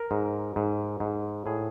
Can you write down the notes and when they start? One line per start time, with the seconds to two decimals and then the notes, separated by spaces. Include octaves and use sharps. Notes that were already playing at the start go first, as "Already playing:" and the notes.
Already playing: A#4
0.11 G#2
0.56 G#2
1.00 G#2
1.46 A2 G#4